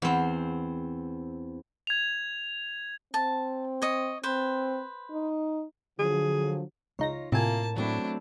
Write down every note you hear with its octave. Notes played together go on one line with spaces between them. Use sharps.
E2 C4
G#6 F7
C4 A5
C#5 D#5
C4 B4 C5
D#4
D3 F3 F#3 G#4
C#2 D#4 F4 C#5 A#6
A2 C3 A#3 F4 E5 G#5 A5
F#3 A3 C4 D4 E4